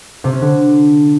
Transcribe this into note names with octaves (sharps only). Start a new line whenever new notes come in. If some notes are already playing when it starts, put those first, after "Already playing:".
C3
C#4
D3